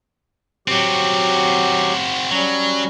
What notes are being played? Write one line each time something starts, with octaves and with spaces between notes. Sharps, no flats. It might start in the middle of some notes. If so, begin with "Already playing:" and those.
F#3 C4 F#4 G4
F#3 G3 C#4